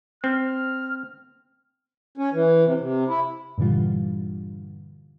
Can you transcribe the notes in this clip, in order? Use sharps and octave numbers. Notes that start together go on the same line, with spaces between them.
C4 F6
C#4
E3
C3
C3
E4
G2 A#2 D3 E3 G3 F4